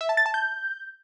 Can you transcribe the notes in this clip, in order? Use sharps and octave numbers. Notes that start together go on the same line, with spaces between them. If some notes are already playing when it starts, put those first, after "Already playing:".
E5
A5
A6
A5
G6